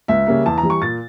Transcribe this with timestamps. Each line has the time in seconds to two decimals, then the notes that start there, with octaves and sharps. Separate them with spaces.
0.08 C#2 E5
0.27 C#3 G3 A#3
0.46 E2 A5
0.58 A#5
0.63 E3 G3
0.70 C#6
0.82 A#2 A6